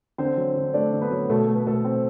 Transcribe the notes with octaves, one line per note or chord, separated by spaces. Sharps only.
D3 C4 C5
F#3
D3
A3 D4 D5
D3
B3 B4
F#3
B2 A3 A4
A3
B4
B2 A3 A4
C4